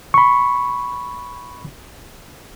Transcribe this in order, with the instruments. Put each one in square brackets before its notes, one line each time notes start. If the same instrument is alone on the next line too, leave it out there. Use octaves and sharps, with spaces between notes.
[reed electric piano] B5 C#6